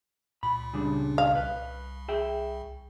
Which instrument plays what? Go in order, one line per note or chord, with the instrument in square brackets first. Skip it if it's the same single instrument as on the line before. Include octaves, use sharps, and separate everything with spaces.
[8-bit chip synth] C#2 A#2 [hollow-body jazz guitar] B5
[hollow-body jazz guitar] C#3 G3 D4
[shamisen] F5
[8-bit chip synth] C2 [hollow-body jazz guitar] B4
[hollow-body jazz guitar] G#4 E5 G5